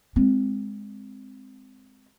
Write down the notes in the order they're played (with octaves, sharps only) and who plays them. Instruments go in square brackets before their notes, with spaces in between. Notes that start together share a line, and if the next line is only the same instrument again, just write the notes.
[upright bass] G#3 C4